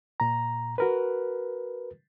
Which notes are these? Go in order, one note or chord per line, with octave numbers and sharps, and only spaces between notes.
A#2 A#5
F#4 A#4 B4